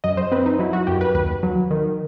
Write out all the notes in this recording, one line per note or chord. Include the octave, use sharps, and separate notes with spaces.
F#2 D#5
C5
C4 B4
D#4
F#3 E4
F#4
F#2 G4
B4
D#2 B4
F#3
D#3